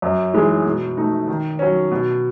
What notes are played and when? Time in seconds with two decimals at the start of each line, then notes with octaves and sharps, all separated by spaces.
0.02 F#2
0.34 E3 G#3 D#4 G#4
0.65 B2
0.97 A3 D#4
1.28 D#3
1.59 F#3 C#4
1.91 B2